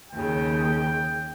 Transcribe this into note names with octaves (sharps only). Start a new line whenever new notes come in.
D#2 C#3 G5